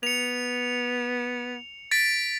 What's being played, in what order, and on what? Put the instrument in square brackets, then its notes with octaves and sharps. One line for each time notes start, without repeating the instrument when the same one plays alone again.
[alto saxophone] B3 [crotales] C#7 F7
[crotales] A6 B6 D7